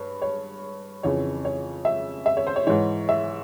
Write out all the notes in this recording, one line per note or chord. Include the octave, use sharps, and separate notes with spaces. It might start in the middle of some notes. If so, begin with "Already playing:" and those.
Already playing: G2 C#5
C#5
F2 C#3 E3 C#5
C#5
E5
E5
C#5
C5
C#5
G#2 E3 C#5
E5